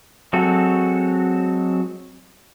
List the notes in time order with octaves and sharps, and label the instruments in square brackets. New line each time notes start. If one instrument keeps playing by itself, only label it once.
[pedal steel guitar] F#3 G#3 C4 F#4 A4